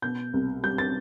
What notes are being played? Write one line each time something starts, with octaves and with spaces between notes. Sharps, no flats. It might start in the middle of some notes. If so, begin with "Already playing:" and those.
B2 G6
C2
G3 G6
A6